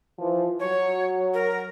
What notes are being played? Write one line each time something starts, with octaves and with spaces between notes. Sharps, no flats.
E3 F3
F#3 C#5
A#4